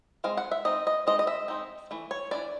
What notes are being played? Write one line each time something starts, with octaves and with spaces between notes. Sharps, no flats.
G#3 C4 F5
F#5
E5
G#3 C4 D#4 D#5
D#5
G#3 C4 D#4 D#5
D#5
E5
G#3 C4 D#4
E3 A3
C#5
E3 A3 D4 D5